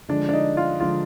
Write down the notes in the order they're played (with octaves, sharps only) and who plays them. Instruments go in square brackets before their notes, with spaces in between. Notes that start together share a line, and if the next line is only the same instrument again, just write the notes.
[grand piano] D3 F3 G#3 [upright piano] D4
[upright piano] D4
D#4
F4
[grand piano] D3 F3 G#3 [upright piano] F4